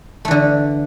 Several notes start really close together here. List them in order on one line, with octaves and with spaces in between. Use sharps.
A3 E3 D3